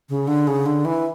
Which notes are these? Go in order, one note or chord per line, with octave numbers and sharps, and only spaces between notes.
C#3
D3
C#3
D3
E3